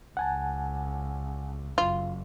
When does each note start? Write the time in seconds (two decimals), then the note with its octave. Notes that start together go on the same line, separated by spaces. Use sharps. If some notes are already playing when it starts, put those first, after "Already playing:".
0.17 C#2 F#5 G#5 A5
1.78 F#1 F4